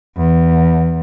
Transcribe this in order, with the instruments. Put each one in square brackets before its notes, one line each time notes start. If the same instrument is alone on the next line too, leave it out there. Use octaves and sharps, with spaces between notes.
[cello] E2